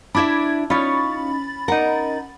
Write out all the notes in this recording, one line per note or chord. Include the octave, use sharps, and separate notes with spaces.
D4 E4 E5 B5 D6 G#6
C#4 D#4 F4 C#5 B5 A6
D#4 A#4 F#5